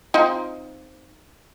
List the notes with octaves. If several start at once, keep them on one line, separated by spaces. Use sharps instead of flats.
C4 D#4 F4